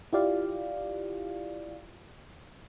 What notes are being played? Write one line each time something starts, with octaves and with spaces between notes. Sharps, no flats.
E4 F4 G4 D5 F5